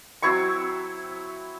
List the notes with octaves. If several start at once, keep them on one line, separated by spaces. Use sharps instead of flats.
F#3 C4 E4 C#6